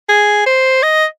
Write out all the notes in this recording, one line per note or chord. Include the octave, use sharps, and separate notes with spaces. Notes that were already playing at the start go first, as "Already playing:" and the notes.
G#4
C5
D#5